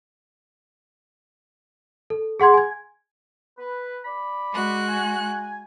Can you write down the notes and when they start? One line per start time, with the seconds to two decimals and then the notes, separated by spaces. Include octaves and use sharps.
2.10 A4
2.40 G#4 F#5 C6 G#6
2.54 G#5 G#6
3.58 B4
4.04 D5 B5
4.52 G#3 F#4 F#6
4.89 G#5